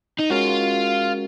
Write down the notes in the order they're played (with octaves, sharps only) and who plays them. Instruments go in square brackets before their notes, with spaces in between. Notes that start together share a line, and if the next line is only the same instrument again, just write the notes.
[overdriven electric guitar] D#4
[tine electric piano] G#3 C#4 F#4 A#4 [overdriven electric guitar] F4